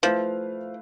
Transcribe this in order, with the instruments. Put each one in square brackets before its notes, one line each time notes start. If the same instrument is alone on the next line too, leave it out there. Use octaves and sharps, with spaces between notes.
[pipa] F3 [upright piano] A3 E4 B4 F5